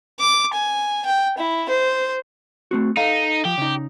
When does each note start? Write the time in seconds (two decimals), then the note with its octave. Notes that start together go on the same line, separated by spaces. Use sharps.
0.20 D6
0.54 G#5
1.06 G5
1.38 E4
1.69 C5
2.71 A3 C4 F#4
2.97 D#4 A4 F5
3.45 F3 G4
3.58 C#3 D#4